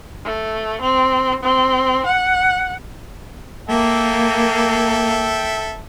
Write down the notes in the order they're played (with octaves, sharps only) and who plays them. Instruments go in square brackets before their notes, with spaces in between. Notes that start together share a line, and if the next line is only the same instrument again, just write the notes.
[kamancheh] A3
C4
C4
F#5
[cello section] A#3 [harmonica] A4 E5 G5